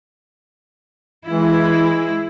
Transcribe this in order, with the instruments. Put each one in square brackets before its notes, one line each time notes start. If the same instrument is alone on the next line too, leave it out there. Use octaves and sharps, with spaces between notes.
[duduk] E3 [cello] G#3 E4